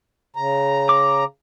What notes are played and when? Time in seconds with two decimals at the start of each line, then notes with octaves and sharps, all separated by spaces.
0.36 C#3 A#5
0.89 D6